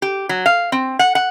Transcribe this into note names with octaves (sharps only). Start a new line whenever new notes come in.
G4
F#3
F5
C4
F#5
F#5